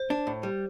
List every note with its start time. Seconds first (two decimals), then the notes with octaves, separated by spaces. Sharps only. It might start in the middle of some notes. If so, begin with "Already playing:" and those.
Already playing: C5
0.10 D4
0.27 A2
0.43 G3